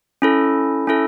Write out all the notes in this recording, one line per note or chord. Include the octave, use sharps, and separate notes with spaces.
C#4 E4 A4
C#4 E4 A4